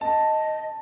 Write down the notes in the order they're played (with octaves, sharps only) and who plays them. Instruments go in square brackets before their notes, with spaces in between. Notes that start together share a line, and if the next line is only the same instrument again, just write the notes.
[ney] D#5 [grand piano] A5